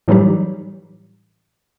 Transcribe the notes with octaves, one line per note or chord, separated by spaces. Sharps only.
A2 E3 F#3 G3 D#4 G4